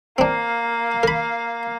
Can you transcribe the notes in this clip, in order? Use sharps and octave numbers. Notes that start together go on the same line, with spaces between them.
A#3 C4 D4 F5
A#4 B5